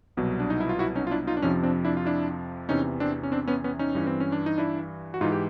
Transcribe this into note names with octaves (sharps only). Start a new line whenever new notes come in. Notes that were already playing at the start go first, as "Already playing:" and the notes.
C2 B2 F#3
D4
D#4
E4
F4
E4 F#4
C#4 D#4
F4
D4 E4
D#4 F4
D4
F2 C3 F3 C#4 D#4
C4 D4
D4 E4
F4
D4 E4
E2 C3 E3 C#4 D#4
C4 D4
C#4
C4 D4
B3 C#4
B3 C#4
C#4 D#4
G2 E3
C4
C#4
D4
D#4
D4 E4
F#4
G#2 E3 D#4 F4
G4